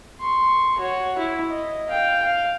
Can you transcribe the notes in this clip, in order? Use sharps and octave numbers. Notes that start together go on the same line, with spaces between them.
C6 C#6
F#4 C#5
E4
D#5
F5 G5
F5